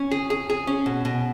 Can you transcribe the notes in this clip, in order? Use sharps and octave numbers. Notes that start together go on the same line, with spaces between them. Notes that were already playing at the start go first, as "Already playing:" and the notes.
Already playing: C#4
G#4
G#4
G#4
C#4
B2
B2